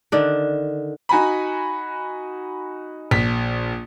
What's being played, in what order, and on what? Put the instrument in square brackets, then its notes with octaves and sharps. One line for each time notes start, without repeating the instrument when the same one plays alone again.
[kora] D3 D#3 D4
[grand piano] D#4 F#4 G#5 A#5 B5
A#1 B6